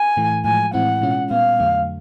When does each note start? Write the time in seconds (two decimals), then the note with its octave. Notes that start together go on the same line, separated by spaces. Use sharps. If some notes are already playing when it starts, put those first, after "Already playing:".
Already playing: G#5
0.17 A2 E3 A3
0.44 A2 F3 G#3 G#5
0.73 A2 E3 G#3 C4 E4 F#5
1.02 B2 G#3 C#4 F4
1.30 A#2 G3 B3 F5
1.59 F2 D3 F#3 A3